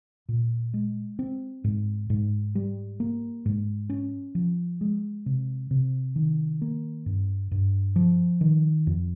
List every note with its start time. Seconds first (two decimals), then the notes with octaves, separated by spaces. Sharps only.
0.29 A#2
0.74 G#3
1.19 C4
1.64 G#2
2.10 G#2
2.55 G3
3.00 A#3
3.45 G#2
3.90 C#4
4.35 F3
4.81 G#3
5.26 C3
5.71 C3
6.16 D#3
6.62 A#3
7.06 G2
7.51 G2
7.96 F3
8.41 D#3
8.87 F2